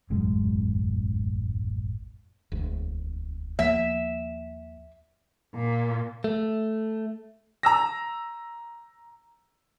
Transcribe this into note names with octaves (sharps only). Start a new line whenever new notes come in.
E1 A1 F#2 G#3
E1 D2
D#2 F3 A#3 E5
A#2
A3
A#5 E6 A#6